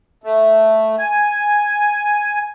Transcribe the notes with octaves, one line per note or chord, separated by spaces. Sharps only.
A3
G#5